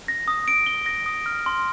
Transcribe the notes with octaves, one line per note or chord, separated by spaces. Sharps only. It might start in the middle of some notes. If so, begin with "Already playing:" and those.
A#6
D#6
D7
G7
A#6
D#6
F6
C6